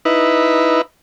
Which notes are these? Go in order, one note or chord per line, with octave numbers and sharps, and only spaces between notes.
D#4 E4 B4